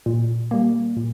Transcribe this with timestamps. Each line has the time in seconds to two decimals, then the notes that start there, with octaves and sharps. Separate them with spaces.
0.06 A#2
0.51 G3 A#3
0.97 A#2